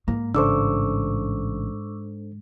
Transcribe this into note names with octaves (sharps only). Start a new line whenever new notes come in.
G#2 A#3
A1 C#3 D4 A4 C5 C#6 D6 E6